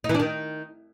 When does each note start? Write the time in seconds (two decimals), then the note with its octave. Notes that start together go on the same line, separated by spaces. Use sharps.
0.04 D#4
0.09 E3
0.15 D4
0.20 D#3